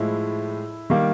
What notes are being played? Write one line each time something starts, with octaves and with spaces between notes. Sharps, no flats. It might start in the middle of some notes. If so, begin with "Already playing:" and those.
Already playing: A2 F3 G#3 E4
D#3 G3 A#3